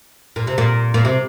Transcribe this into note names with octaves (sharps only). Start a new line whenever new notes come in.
A#2
C3
A#2
A#2
C3